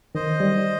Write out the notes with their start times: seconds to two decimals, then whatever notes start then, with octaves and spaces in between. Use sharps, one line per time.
0.15 D#3 C5 D#5
0.40 G3